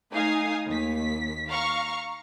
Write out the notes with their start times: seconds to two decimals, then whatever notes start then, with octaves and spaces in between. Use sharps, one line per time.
0.13 A3 D#4 F5 G#5 D#6 C7
0.68 D#2 B6
1.48 F5 A#5 C#6 F6